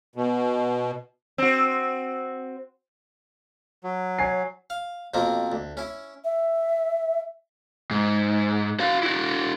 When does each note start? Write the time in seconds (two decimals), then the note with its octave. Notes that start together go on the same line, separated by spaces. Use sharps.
0.16 B2
1.38 C4 F#4
3.84 F#3
4.19 C#5 G#5 C7
4.70 F5
5.14 F2 B2 A#3 C4
5.52 D2
5.77 C#4 E4
6.24 E5
7.91 G#2
8.80 F#4 F5
9.03 E4 F#4